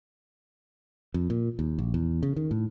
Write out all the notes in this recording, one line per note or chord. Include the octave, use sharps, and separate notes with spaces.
F2
A#2
D#2
A#1
E2
C#3
D#3
A2